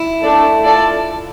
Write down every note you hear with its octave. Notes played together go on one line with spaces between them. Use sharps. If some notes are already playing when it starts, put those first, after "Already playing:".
Already playing: E4
A3 D4 A4 D5
F4 A4 D5 A5